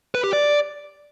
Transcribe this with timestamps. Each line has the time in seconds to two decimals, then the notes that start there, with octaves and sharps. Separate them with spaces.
0.15 B4
0.24 G4
0.33 D5